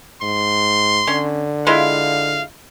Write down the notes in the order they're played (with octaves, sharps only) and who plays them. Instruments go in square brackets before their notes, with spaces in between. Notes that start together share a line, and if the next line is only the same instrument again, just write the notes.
[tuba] G#2 [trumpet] C6
[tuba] D3 [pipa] C#4
[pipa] G#3 E4 F4 [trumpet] F5